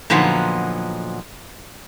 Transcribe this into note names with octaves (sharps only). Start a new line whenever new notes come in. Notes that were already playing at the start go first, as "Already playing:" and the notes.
A#2 D3 F3 F#3 B3 D#4